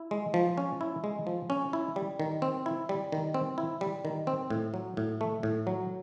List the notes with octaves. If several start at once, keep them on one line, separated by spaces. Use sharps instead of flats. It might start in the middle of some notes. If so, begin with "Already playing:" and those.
Already playing: E4
G#3
F3
C#4
E4
G#3
F3
C#4
E4
G3
D#3
C4
E4
G3
D#3
C4
E4
G3
D#3
C4
A2
F#3
A2
A3
A2
F#3